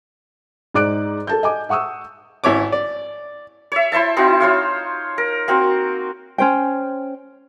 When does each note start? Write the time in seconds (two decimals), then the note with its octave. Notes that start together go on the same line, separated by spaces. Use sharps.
0.74 G#2 D#4 D5 D6 F#6 D7
1.27 A4 A5 G6
1.43 D#5 G#5 D6
1.69 E5 F#5 C#6 D#6 E6
2.44 G#1 E4 C#5 D6
2.72 D5
3.72 C#5 E5
3.92 E4 C5 E5 A5
4.17 C4 D#4 E4 F#4
4.40 F4 C5 C#5 F5
5.18 A#4
5.48 A#3 C4 F#4
6.38 C#4 C5 G5